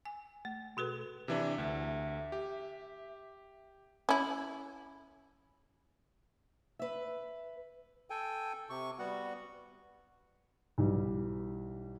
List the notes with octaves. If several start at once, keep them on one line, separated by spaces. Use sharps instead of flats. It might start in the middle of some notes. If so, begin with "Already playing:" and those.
G#5
A3
B2 F#4 A4 B4
C3 E3 D4 E5
D2 E5
G4
C#4 E4
B4 E5
A4 G5 G#5
C3 C#6
G3 B3 F#4 F#5
B1 E3 G3